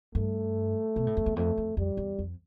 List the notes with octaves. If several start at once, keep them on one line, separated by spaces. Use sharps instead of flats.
G2 A3
B2
A2
F2
E2
F2 A3
F2
F2 G3
E2
F2